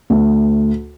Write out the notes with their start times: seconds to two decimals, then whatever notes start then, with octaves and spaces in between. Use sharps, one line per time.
0.10 D2